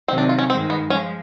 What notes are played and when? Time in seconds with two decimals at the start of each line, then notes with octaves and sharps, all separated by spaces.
0.08 C3 D#3 F#3 C4
0.18 D4
0.29 F4
0.38 C#4
0.50 G2 D#3 G#3 C4
0.70 B3
0.90 F3 G#3 C#4